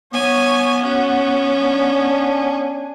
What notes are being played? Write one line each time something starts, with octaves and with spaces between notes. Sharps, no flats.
B3 C#5 G#5
C#4 F#4 F#5
D4 G#5